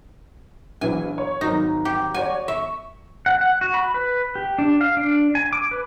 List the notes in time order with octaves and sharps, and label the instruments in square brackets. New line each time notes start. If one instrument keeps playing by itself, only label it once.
[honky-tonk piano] A#1 E3 F#3 [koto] G#5
[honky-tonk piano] C#5
[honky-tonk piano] G#1 F#3 A#4 [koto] D#4
[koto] G4
[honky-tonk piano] F#4 C#5 D5 [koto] G#5
[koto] E5 [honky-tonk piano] C#6
[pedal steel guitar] F#5
F#5
F#4
B5
B4
G4
D4
F5
D4
G#5
D6
B4